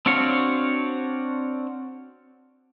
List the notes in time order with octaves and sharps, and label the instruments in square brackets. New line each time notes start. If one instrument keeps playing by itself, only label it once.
[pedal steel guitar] C4 D4 F#4 C#5 F5